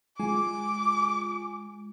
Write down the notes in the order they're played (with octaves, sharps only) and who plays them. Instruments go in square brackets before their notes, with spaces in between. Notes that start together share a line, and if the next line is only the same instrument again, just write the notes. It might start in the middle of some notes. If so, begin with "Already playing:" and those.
[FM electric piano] G#3 F4 G#5 [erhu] D6